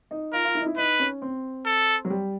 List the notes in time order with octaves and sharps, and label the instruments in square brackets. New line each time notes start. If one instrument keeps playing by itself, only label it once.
[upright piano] D#4
[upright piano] F4 [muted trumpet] A#4
[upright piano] F4
E4
D#4
E4
[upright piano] D#4 [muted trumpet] B4
[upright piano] C#4
C4
[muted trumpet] A4
[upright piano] F#3
G3